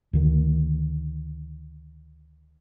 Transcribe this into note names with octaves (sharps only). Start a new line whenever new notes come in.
D2 D3 D#3